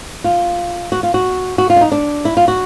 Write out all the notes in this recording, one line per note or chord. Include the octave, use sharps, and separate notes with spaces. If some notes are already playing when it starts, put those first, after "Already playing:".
F4
F#4
F4
F#4
F#4
F4
D4
D#4
D4
E4
F4
F#4